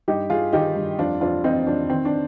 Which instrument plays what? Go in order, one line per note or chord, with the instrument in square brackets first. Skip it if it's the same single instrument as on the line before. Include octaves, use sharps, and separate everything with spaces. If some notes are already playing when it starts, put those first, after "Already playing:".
[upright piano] G2 D#4 G4
G2 F4 G#4
D#3 D#4 G4
G2
F2 D4 F4
F2 D4 F4
F2 C4 D#4
F2 D4
D#3 C4
D4